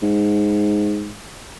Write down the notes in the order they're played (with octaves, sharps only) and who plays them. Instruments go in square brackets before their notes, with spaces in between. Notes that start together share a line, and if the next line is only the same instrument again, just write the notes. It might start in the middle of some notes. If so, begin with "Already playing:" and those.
[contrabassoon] G#2